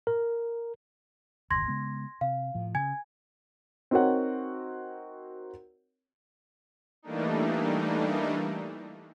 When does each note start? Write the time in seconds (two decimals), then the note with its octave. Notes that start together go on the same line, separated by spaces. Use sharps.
0.07 A#4
1.50 D1 G1 D#2 C6 G#6 A#6
1.68 C#3 G#3 B3
2.21 C3 F5
2.55 A2 F3
2.75 C#3 G#5 G#6
3.91 C4 D#4 F#4 A#4 C#5 F#5
7.02 E3 G3 A3 A#3 D4 D#4